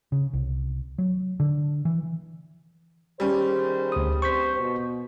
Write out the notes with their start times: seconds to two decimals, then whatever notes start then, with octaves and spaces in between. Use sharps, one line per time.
0.12 C#3
0.33 C2
0.98 F#3
1.40 D3
1.85 E3
3.20 D#3 G3 C#4 G#4 C5
3.92 D2 D#6
4.22 G2 C4 C5 C#6 G6 B6
4.59 B2